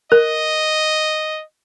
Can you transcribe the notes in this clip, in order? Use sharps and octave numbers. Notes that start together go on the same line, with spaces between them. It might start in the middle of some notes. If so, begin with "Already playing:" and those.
A#4 D#5